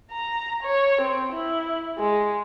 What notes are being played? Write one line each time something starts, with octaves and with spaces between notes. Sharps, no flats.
A#5
C#5
C4
E4
G#3